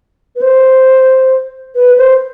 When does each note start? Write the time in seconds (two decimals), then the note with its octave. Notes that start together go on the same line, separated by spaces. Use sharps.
0.36 B4
0.41 C5
1.75 B4
1.98 C5